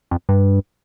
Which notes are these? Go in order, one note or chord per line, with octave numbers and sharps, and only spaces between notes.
F2
G2